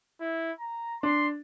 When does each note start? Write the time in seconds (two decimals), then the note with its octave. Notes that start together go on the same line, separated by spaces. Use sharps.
0.21 E4
0.60 A#5
1.03 D4 C6